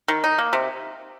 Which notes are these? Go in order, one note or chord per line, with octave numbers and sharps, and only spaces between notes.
D#3
D#4
A#3
C3